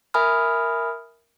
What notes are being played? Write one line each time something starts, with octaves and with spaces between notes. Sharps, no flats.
A#4 E5 G#5 B5 D#6 F6